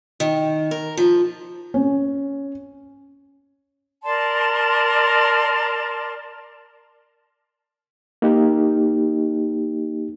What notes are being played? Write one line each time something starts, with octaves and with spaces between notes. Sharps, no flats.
D#3
A#4
F3
C#4
A#4 D5 A5 C6
A#3 D#4 G4